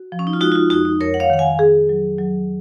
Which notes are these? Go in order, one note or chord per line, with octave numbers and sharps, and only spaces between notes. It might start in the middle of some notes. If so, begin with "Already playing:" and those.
Already playing: F#4
F3
C#4
D#4
F4
G#3 D#4 F#4
F4
D#4 F#4
F2 D#4 F#4
D#4
F2 A#4 C#5
F#5
C#5 F5
D#3 F#5
F5 G#5
G#4
F#3
F#3